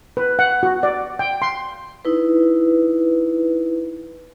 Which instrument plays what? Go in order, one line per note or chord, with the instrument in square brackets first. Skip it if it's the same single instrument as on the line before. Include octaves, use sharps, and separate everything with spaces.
[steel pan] B4
F#5
F#4
D5
G5
C6
[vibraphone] D#4 E4 B4